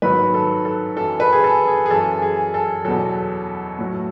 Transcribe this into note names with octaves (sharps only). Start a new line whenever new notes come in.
G#2 D#3 F#3 B4
A4
A4
F#2 E3 A4
B4
G#4
A4
G#4
G#4
F#2 E3 A4
G#4
A4
E2 B2 F#3 A4
A2 F#3